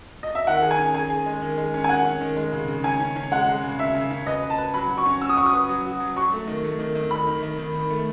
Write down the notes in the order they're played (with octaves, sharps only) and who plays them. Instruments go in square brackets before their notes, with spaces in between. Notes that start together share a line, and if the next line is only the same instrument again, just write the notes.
[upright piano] D#5
E5
[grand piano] D#3 [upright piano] F#5
[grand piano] G#4
[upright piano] G#5
[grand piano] C#4
[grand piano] G#4 [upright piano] G#5
[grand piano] G#4
G#3
D#3
G#3
C#4
[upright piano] G#5
[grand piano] D#3 [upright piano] F#5
[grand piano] C#4
D#3
G#3
C#3
C#3
[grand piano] C#4 [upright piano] G#5
[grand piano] C#4
C#4
[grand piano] G#3 [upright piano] F#5
[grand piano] G#3
C#3
[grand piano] C#4 [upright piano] E5
[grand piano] C#3
C#4
[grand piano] B4 [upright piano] D#5
[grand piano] B4
[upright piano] A5
[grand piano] B4
[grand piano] F#3 [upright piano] B5
[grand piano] F#4
[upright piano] C#6
[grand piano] C#4
[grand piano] F#4 [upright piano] E6
[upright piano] D#6
[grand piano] F#4 [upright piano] C#6
[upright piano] D#6
[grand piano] B4
F#3
F#4
F#3
[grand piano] F#3 [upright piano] C#6
[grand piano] A3
D#3
A3
D#3
D#3
[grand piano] D#3 [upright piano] B5
[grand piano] D#3
D#3
D#3
D#3
A3